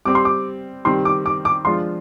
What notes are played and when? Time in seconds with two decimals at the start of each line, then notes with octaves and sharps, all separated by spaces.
0.05 G3 C4 G4 D6
0.15 C6
0.25 D6
0.85 D#3 G3 C4 G4 C6
1.05 D6
1.26 D6
1.45 D6
1.65 F3 G#3 D4 F4 C6